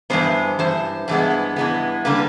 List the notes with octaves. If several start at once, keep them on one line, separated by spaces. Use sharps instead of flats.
G2 E3 G#3 B3 C5
G2 E3 C5
G2 E3 G#3 B3
G2 E3 G#3 B3
D3 G3 A#3 B4